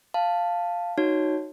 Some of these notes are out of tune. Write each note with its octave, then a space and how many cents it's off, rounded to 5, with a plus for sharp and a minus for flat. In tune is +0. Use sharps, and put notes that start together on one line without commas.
F5 +0 A5 +0
D#4 +0 F#4 +0 C#5 +0